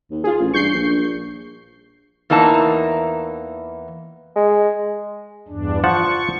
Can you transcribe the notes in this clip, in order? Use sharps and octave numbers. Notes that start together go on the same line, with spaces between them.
D#2
F4 G#4
A1
G2 C#6 G6 C7
A#1
E2 E3 A#3 D#4 A5
G#3
E2 G2 D4
F3 F#5 A5 C#6